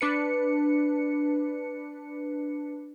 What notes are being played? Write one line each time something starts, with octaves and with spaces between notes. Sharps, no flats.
D4 B4 C#7